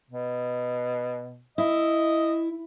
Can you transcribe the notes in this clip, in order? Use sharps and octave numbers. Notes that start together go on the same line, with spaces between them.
B2
E4 D#5